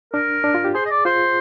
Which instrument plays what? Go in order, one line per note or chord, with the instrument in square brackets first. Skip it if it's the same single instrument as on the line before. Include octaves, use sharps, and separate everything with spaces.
[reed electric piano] D4 [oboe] A#4
[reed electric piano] D4
F4
G4
[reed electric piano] G#4 [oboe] C5
[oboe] D#5
D5
[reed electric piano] F4 [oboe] C5